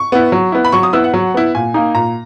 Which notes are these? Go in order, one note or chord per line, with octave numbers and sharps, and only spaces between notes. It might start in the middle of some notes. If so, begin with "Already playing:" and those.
Already playing: C#6
B3 E4
F#3
B3 E4
B5
F#3 C#6
D#6
B3 E4 E6
F#5
F#3
B3 E4
A#2 G#5
A#3 D#4
A#2 A#5